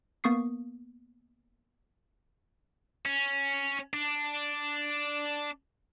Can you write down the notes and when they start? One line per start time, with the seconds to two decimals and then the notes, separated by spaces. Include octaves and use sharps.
0.24 A#3 B3 C#6 D#6 C7
3.06 C#4
3.93 D4